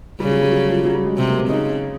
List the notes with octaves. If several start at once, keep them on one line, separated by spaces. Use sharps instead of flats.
C#3 G3
F#3
G3
F#3
F3
F#3
G3
G#3
C3
A#3
C4
C#3 D#4